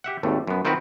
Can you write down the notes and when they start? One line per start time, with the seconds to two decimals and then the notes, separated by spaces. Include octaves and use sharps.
0.04 G4 E5 F#5
0.23 G#1 D#2 A3
0.47 F#2 B3
0.65 D#3 C4 F4 F#4 A#4 B4